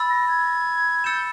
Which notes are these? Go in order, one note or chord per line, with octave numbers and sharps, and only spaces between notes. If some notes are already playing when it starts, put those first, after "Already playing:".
Already playing: B5 E6 A6
A#6
G#6
E6 G6 A6 C#7 E7